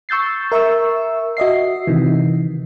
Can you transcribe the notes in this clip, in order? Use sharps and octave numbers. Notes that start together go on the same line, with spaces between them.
C#6 E6 G6 A6 C7
A#4 E5 C#6 E6
F#4 D#5 E5 C7
C3 D#3 E3